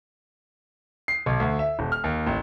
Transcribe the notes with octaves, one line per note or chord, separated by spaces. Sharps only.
C7
B1
D2
E5
D#1
F6
D#2
A1